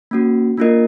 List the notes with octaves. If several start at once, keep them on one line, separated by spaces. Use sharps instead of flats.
A#3 C#4 F#4
A#3 D4 F4 A#4 D#5